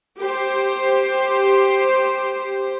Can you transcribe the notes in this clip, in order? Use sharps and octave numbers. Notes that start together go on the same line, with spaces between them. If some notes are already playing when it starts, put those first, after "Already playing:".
G4 C5